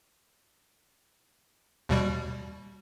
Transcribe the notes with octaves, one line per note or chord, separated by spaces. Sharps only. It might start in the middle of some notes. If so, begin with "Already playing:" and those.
D#2 B2 G3